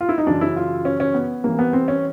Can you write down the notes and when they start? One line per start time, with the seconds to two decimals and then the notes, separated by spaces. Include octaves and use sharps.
0.01 F4
0.09 E4
0.18 D#4
0.27 F#2 C#3 E3 D4
0.41 E4
0.56 F4
0.85 C#4
1.00 C#4
1.14 B3
1.44 C2 C3 E3 A#3
1.59 B3
1.73 C4
1.88 C#4